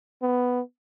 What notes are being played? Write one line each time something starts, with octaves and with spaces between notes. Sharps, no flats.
B3